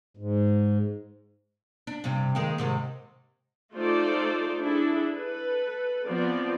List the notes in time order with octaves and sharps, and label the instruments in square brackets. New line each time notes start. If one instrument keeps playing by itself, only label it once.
[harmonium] G#2
[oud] D4
G2 C3 G3
D#3 G#3 A#3
G#2 C3 D#3
[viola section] A3 D#4 F4 A4 C5 D5
D4 E4 G#4 A4
A4 B4
F3 B3 C4 D5